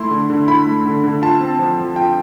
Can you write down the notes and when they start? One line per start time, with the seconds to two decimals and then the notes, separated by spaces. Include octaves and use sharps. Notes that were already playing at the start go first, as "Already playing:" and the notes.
Already playing: A3 E4 C6
0.11 D3
0.30 D3
0.48 E4 B5
0.67 A3
0.86 D3
1.04 D3
1.22 F4 A5
1.41 C4
1.59 F3
1.77 F3
1.96 F4 G5